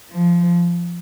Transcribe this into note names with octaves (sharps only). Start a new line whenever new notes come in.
F3